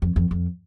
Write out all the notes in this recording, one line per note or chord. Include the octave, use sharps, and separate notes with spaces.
F2
F2
F2